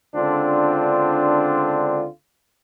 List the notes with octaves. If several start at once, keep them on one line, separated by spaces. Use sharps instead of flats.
C#2 D3 C4 D4 F4